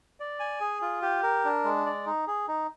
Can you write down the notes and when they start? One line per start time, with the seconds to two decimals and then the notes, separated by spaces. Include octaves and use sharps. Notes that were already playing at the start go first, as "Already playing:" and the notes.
0.20 D5
0.40 G#5
0.60 G#4
0.82 F4
1.02 G4
1.23 A#4
1.45 D4
1.64 G#3
1.86 D5
2.06 D#4
2.27 G#4
2.48 D#4